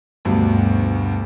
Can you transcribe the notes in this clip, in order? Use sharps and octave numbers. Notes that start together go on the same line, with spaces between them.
D2 G2 B2